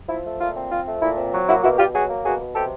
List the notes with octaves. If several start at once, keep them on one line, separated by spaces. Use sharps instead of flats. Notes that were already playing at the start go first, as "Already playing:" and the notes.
F3 E4
A3
A#2 F4
C4
F3 F4
A3
A#2 E4
C4
F#3
A#3 E4 F#4
B2 E4 F#4
B2 F4 G4
F#3 F#4 G#4
A#3
B2 F#4 G#4
B2
C3 G4 A4